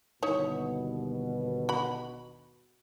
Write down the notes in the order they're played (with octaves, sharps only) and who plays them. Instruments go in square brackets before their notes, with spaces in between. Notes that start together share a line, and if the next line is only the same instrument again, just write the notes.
[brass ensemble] G1 D#2 B2 [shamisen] D#4 E4 C#5
[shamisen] F#4 B5